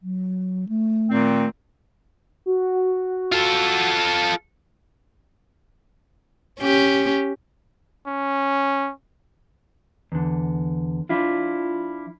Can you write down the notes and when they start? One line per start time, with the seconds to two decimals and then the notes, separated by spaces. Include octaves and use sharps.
0.02 F#3
0.68 A3
1.09 A#2 D#3 C4
2.46 F#4
3.32 F4 A4
6.60 C#4 G4
8.07 C#4
10.12 E2 D3
11.09 F3 D4 E4 F4